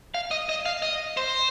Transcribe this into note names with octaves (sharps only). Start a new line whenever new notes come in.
F5
D#5
D#5
F5
D#5
C5